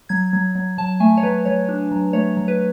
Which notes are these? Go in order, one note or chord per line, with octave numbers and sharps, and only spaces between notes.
F#3 G#6
F#3
F#3
F#3 A5
A3 G#5
C#5
F#3 B4
F#3 C#5
D4
F#3
A3 C#5
F#3
B4